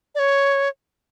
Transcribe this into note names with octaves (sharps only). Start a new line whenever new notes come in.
D5
C#5